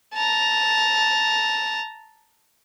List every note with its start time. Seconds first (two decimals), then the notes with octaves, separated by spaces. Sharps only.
0.14 A5 A#5